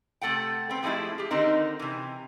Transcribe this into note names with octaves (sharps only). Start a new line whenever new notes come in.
C3 A3 A4 F#5 G5
B3 C4
F3 G#3 A3 D#4 E4 G4
G4 G#4
D3 D#3 C4 D#4 A#4
C3 E3